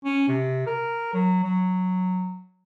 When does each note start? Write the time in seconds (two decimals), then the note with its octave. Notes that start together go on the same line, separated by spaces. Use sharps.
0.04 C#4
0.28 C3
0.66 A#4
1.13 F#3
1.44 F#3